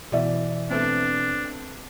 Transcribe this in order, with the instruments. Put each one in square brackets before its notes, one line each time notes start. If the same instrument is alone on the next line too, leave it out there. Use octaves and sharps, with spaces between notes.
[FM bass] B2 [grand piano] E3 D5 E5
[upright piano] A3 B3 C4 [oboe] D4